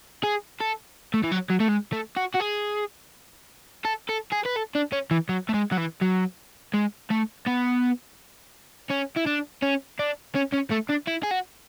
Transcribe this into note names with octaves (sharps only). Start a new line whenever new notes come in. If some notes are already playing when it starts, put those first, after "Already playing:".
G#4
A4
A3
E3
F#3
F#3
A3
G#3
A3
F#4
F#4
G#4
A4
A4
G#4
B4
A4
D4
C#4
E3
F#3
A3
G#3
F#3
E3
F#3
G#3
A3
B3
C#4
E4
D4
C#4
D4
C#4
C#4
A3
D4
E4
G#4
F#4